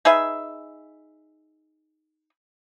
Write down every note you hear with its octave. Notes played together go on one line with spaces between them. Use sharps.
D#4 G#4 B4 E5